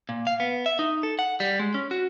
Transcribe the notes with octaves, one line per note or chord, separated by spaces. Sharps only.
A#2
F5
B3
E5
D#4
A4
F#5
G3
G#3
C#4
F#4